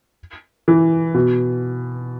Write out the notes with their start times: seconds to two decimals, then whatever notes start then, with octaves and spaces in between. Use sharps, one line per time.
0.68 E3
1.14 B2